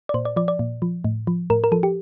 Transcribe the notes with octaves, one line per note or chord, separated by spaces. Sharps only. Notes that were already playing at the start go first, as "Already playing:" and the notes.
D5
A#2 C5
D5
F3 D5
D5
A#2
F3
A2
F3
A2 A#4
A#4
F3 A4
G4